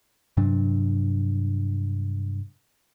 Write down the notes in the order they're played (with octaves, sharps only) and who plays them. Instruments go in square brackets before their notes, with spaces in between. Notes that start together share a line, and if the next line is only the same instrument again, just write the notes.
[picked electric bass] G2 C3 F#3 D4